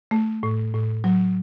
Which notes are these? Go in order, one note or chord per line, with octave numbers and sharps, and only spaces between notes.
A3
A2
A2
F#3